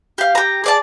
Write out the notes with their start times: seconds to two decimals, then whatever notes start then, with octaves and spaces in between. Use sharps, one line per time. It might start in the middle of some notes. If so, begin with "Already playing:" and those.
0.18 G4 F5
0.35 G4 A#5
0.64 G#4 D5 A5